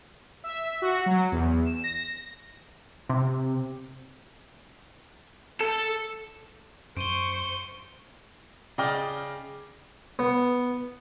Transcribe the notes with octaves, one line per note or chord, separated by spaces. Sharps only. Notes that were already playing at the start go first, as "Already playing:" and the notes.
E5
F#4
F#3
E2
E7
A#6
C3
A4
F#2 C5 C#6 D7 D#7 G7
C#3 D5 D#5 G5 D6 F6
B3